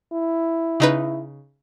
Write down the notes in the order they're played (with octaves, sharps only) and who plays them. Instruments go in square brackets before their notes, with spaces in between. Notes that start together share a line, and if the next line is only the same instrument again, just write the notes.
[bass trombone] E4
[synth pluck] C#3 D#4 B4